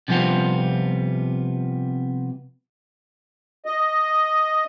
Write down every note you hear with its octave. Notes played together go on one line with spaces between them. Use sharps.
C3 F3 G3 B3 C4 F4
D#5